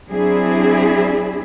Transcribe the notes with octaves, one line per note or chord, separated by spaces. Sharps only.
F#3 C4 D4 E4 G#4